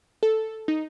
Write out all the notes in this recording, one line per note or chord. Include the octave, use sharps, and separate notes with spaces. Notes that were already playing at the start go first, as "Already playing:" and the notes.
A4
D#4